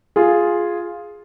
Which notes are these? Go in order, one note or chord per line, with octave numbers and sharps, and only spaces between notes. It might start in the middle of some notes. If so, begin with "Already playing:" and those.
F4 G#4